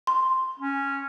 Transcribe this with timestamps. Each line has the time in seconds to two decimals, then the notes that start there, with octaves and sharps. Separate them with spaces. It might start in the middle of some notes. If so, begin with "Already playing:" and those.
0.07 C6
0.60 C#4